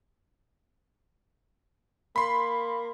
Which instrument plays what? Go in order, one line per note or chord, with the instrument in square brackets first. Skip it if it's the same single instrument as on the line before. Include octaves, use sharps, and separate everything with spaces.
[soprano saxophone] A#3 [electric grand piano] B5 C6